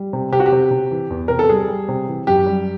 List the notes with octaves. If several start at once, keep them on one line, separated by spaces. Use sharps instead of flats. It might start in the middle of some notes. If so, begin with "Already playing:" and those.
Already playing: G3
C3
C3 G4
F#4
G4
C3
C3
E3
E2
C3 A#4
A4
G3 G#4
G3
C3
E3
F#2 G4
G3